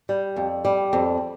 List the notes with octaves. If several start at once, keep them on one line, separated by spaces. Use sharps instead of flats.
G3
F2
G3
F2